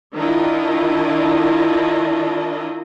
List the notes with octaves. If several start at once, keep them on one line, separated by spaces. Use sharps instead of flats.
D#3 D4 E4 F4 D#5